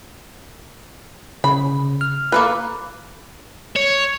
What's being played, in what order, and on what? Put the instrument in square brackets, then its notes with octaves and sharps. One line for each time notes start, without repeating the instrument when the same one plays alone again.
[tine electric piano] C#3 [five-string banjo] B5
[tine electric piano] F6
[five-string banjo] A#3 A4 B4
[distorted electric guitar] C#5